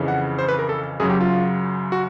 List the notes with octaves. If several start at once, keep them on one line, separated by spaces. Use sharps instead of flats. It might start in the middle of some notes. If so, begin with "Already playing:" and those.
Already playing: F2 C#3 E3
F#5
C5
B4
A#4
A4
F#2 C#3 F#3 G#4
G4
F4
F#4